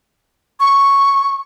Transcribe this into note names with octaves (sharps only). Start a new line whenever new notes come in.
C#6